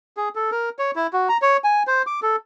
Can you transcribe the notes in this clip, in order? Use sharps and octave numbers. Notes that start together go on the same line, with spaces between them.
G#4
A4
A#4
C#5
E4
F#4
A#5
C#5
G#5
C5
D6
A4